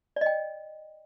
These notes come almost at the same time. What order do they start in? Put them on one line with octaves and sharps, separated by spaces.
D5 D#5 G5